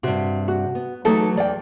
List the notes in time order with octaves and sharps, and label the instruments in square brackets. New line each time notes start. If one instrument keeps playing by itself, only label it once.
[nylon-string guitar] G2 C3 [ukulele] F#4
[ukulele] F#4
[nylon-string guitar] B3
[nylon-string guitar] E3 F#3 A3 [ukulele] D#4 A4
[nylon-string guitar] E2 [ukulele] D5 G5